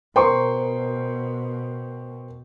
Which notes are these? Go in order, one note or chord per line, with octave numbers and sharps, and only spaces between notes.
B2 A#4 C5 G5 C6 C#6